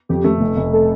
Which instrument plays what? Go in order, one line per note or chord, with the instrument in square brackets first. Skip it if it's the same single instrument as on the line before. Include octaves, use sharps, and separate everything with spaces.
[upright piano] F2 [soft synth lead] G4
[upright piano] A3
F1
F1
[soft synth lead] A4